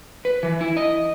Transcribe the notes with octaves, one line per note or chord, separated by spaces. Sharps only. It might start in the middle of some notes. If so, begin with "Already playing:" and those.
B4
E3
E4
D#5